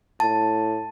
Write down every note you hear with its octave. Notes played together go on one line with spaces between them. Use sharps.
A2 A5